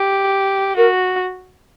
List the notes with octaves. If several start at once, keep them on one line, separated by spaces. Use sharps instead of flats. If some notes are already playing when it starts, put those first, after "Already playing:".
Already playing: G4
F#4 A#4